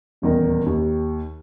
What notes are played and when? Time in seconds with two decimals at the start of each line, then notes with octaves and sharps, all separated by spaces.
0.22 D#1 E2 D#3 A#4 D#5
0.66 D#2